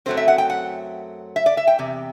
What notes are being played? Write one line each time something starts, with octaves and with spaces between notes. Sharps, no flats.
F#2 F#3 A3 C4 C5
E5
F#5
G5
F#5
E5
D5
E5
G5
E2 C3